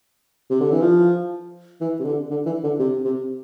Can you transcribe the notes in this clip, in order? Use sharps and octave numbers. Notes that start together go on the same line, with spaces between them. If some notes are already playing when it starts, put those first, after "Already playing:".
C3
D3
E3
F3
E3
C3
D3
D3
E3
D3
C3
C3